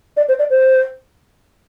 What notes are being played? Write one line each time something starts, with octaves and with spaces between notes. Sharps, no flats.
D5
C5
D5
C5